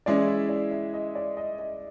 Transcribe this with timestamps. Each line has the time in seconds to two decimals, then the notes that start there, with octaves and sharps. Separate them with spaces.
0.06 E3 G#3 C#4 E4 G#4 D5
0.28 E5
0.49 D5
0.71 E5
0.94 D#5
1.15 D5
1.37 D#5
1.59 D#5